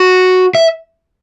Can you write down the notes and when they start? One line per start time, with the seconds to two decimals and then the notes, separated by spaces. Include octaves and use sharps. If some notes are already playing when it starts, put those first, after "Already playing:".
Already playing: F#4
0.55 E5